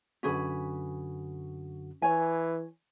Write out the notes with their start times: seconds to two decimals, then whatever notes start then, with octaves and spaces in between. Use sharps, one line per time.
0.23 F#2 D3 C#4 F#4 G#4 B4
2.02 E3 C#5 G#5